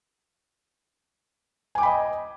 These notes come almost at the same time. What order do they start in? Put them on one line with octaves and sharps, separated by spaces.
G#5 D6 G5 B5 D#5